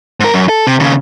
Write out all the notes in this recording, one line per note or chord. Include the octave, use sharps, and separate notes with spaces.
G#2 A#4
F#2
A4
C3
D#2 C#3